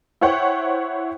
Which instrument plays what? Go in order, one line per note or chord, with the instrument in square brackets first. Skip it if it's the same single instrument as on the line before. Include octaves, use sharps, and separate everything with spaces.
[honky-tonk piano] E4 C5 C#5 F#5 G5 C#6